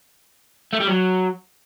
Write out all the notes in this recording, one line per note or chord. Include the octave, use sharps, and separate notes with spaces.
A3
G3
F#3